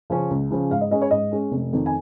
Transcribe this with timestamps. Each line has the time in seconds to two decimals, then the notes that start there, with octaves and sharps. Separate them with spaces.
0.10 C#3 F3 C#4
0.30 C#2
0.51 C#3 F3 C#4
0.71 G#2 F5
0.81 D#5
0.91 G#3 C#4 D#5
1.02 C#5
1.11 G#2 D#5
1.31 G#3 C#4
1.52 F1
1.73 F2 D#3
1.86 G#5